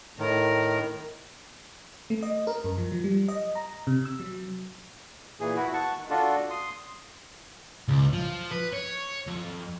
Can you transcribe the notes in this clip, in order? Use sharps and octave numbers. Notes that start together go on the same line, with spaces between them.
A2 D#3 A#4
A3
D#5
A#4
F#2
F3
F3
G3
D#5
A#5
C3
E6
F#3
A#2 E3 G#4
B3 E4 F#4
F#5 A5 C#6
D#3
D4 F4 F#4 A4
C6 D#6
C#2
F3
B4
C#5
F2